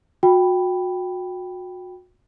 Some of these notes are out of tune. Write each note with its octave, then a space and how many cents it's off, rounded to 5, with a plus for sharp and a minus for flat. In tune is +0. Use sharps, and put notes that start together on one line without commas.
F#4 -30 G5 +0 B5 +5